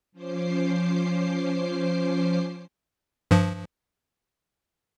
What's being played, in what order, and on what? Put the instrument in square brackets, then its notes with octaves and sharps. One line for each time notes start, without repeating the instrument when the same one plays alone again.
[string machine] F3 C#4 C5 D6 C7
[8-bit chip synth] G2 F3